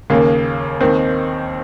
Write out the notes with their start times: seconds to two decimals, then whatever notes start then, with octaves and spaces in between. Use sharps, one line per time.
0.10 D#2 C#3 A#3
0.81 D#2 D#3 C4